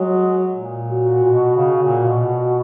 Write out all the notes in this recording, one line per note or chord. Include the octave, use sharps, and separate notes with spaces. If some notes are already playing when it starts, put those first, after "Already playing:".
Already playing: F#3 G#3
A#2
F#4
A#2
B2
C#3
A#2
B2